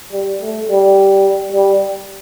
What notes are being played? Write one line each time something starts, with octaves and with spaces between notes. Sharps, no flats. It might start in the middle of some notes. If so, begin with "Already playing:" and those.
G3
A3
G3
G3